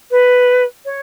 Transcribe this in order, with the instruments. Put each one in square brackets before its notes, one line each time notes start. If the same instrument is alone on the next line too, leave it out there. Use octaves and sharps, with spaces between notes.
[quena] B4
C#5